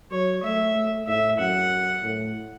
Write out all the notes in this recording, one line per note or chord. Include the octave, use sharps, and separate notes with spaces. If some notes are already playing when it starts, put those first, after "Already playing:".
F#3 C#5
A3 E5
A3
A2 E5
F#2 F#5
A2